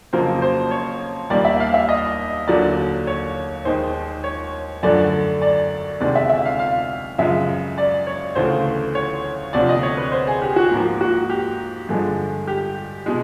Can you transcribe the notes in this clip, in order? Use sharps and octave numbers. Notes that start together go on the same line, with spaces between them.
F2 C#3 F#3 A#3 C5
C5
C#5
D#2 D#3 G3 A#3 D5
E5
F5
E5
D#5
D#2 D3 F#3 A#3 D5
C#5
D#2 D#3 G#3 C5
C#5
F#2 D3 F3 A3 D5
D5
D2 C3 D#3 G#3 D5
E5
E5
F5
F5
F#2 C#3 F3 G#3 E5
D5
C#5
D2 C#3 E3 A3 C5
C#5
D2 C3 F3 D5
D#5
C#5
B4
C5
G#4
G4
F#4
G#2 F3 A#3
F#4
G4
G2 D3 F3 G#3 G#4
G4
B2 G#3 G#4